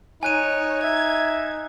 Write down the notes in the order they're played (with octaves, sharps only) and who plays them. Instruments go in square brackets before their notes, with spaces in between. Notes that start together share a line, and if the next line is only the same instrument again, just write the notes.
[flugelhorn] D#4 [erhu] C#5 [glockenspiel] G#5 F#6 D#7
[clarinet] E5 [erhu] G#6